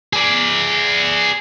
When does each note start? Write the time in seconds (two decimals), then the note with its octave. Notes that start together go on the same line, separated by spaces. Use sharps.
0.13 G#4 D5